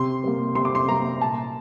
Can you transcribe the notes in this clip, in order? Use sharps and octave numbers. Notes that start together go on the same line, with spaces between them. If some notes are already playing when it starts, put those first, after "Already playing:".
Already playing: C3 C6
G3 A#3
C3 C6
D6
C6
G3 A#3 A#5
A#2 A5